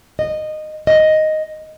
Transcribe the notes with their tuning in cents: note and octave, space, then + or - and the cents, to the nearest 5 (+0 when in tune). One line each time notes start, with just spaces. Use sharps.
D#5 -15
D#5 +0